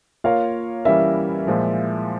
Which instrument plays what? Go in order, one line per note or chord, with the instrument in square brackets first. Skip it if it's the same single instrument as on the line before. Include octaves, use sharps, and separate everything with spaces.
[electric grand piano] A#3 F4 A#4 C#5 [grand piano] F5
[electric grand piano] E3 G3 C#4 E4 A#4 [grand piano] E5
[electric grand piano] A#2 F3 G#3